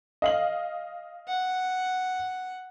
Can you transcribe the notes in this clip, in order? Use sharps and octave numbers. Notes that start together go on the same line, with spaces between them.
D#5 F5 F#7
F#5